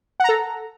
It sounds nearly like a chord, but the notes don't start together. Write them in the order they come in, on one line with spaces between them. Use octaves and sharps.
F#5 A#5 A4